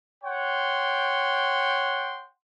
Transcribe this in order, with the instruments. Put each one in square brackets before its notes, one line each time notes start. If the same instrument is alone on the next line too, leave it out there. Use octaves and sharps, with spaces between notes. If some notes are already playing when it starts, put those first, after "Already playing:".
[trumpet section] C#5 F#5 G5 C6